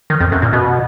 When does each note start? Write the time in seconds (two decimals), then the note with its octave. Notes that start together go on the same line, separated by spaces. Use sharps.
0.10 D#3
0.20 F2
0.32 F#2
0.42 A#2
0.53 B2